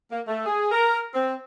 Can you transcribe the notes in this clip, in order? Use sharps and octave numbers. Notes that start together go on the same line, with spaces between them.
A#3
A3
G#4
A#4
C4